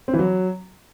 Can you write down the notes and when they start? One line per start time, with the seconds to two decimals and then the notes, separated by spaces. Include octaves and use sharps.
0.08 C4
0.13 E3
0.19 F#3